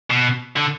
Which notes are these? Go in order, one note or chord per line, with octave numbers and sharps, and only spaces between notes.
B2
D3